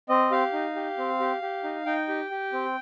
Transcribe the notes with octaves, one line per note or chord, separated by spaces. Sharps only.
C4 D#5
G4 F5
D#4
G4
C4
G4
G4
D#4
D#4 G5
G4
G4
C4